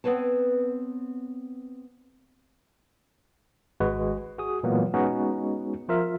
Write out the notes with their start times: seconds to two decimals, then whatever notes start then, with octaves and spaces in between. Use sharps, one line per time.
0.04 B3 C4 B4 C#5 A5
3.80 G#1 G#3 F#4 B4
4.38 F#4 G#4 D#6
4.63 A#2 E3 F#3 G#3 A#3 B3
4.94 G#3 B3 C#4 D#4 F#4
5.88 F3 F4 A#4 E5